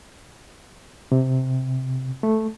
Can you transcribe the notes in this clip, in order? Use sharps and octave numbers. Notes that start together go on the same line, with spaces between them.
C3
A3